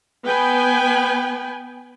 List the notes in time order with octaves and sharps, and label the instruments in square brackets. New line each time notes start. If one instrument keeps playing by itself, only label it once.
[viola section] B3 B4 G5 G#5